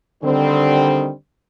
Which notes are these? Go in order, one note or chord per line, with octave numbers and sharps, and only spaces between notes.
D3 D#3 G3 C4